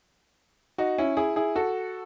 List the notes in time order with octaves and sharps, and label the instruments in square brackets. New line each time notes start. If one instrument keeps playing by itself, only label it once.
[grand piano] D#4 F#4
C#4 E4
E4 G#4
E4 G#4
F#4 A4